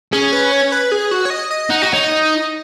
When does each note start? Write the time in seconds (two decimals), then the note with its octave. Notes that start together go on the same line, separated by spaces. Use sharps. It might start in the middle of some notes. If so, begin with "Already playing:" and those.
0.13 C#4 G#4
0.32 B4
0.52 C#5
0.72 B4
0.92 G#4
1.11 F#4
1.25 C#5
1.30 D#5
1.51 D#5
1.70 D#4 F#5
1.82 F#4 D#5
1.93 D#4 C#5
2.04 D#5